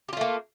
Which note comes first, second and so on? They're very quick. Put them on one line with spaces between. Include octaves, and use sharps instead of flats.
G4 F4 A3 A#3